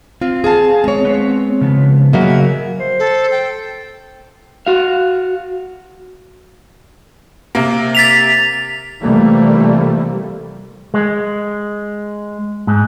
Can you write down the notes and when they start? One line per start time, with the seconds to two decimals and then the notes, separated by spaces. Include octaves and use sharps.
0.21 C4 F4
0.44 G#4 F5 A5
0.84 G#3 C#5
1.05 B3 C4
1.61 C#3 F3 B3
2.13 C#3 F#3 A#3 D#5 E5 F#5
2.80 C5
2.99 A4
3.31 G5
4.67 F#4 F5
7.55 C3 A#3
7.95 A6 B6 F7
9.01 C3 E3 F3 G3 A3 A#3
10.94 G#3
12.67 G#2